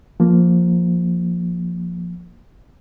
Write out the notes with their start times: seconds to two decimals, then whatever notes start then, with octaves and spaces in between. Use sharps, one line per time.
0.20 F3 A#3